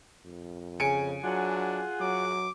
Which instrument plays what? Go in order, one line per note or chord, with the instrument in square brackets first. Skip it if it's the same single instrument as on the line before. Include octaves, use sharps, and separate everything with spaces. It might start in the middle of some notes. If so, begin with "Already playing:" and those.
[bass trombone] F2
[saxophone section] C#3 [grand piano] G#5 C#7 D7
[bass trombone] F#3 [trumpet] D4 [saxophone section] F4 G#4 F#5
[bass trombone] F#3 [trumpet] D6